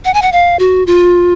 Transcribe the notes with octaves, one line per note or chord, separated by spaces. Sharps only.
F#5
G#5
F#5
F5
F#4
F4